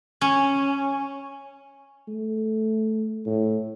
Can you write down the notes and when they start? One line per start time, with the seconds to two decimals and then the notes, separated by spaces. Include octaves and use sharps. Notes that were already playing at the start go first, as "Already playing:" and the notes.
0.21 C#4
2.08 A3
3.26 A2